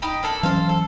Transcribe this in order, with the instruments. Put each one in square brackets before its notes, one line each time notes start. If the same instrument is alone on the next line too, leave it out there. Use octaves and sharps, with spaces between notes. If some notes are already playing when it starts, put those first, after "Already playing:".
[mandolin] D#4 G5 B5
A#3 D4 A4
[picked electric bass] E3 F#3 C#4 [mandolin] A4 C5 F5
[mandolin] A4